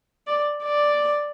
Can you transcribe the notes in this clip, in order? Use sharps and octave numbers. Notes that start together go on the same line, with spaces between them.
D5
D5